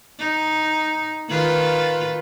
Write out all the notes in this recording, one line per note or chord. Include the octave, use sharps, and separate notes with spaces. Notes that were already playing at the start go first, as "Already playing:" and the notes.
D#4
D#3 F4 B4